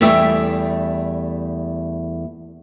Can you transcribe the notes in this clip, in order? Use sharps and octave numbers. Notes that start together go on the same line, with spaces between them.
E2 G3 A3 G4 E5